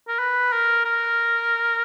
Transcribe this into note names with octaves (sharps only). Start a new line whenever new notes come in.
A#4
B4
A#4
A#4